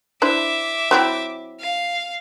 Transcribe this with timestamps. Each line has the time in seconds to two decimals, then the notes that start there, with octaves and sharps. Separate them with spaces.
0.22 D4 E4 C5 E5 D6
0.91 F#3 C4 E4
1.59 F5